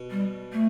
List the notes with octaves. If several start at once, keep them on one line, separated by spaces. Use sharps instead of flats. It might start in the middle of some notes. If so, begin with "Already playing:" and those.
Already playing: B2
G3
A3